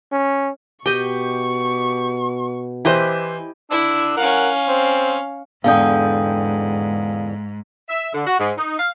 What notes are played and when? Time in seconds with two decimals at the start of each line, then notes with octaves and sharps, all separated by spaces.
0.12 C#4
0.86 B2 G4 D#5 G5 C#6
2.85 E3 E4 G4 C5 D#5
3.71 D4 E4 E6
4.17 C#4 A#4 F5 F#5
4.69 C4
5.64 E2 G#2 D3 F5 G5 G#5 D#6
7.89 E5
8.14 D3
8.27 F#4
8.40 G#2
8.57 D#4
8.79 F5